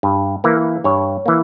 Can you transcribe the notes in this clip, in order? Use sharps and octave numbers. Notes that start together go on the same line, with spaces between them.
G2
E3 A#3 A#4
G2 C#5
E3 A#3